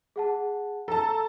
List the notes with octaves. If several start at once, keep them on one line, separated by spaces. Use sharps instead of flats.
G#4 F#5 A5
A4 A5 A#5